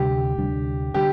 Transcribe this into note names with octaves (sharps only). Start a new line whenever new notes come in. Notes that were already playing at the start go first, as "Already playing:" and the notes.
Already playing: D2 C3 G3 D4 G4
D2 C3 G3 D4
D3 G3 D4 G4